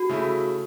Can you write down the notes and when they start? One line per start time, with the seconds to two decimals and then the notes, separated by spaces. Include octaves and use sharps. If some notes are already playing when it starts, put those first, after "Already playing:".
Already playing: F#4
0.09 C#3 A3 E4